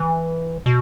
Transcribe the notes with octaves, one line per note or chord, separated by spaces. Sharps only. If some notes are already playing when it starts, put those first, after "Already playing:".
Already playing: E3
B2